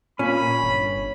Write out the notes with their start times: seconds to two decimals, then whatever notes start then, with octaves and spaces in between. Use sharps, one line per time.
0.19 A#2 C#4 B5
0.63 G1